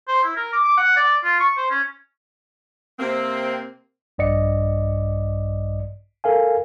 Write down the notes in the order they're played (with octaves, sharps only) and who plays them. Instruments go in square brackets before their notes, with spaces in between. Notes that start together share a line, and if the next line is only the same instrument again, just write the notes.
[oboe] C5
E4
A#4
D6
D6
F#5
D5
F4
C#6
C5
C#4
[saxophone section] C3 A#3 C4
[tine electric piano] A#1 G2 D5 D#5 C#7
A4 A#4 F5 G#5